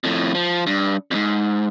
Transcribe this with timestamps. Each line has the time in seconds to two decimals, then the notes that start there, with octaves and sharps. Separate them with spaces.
0.04 F2 A2
0.35 F3
0.67 G2
1.11 F2 G#2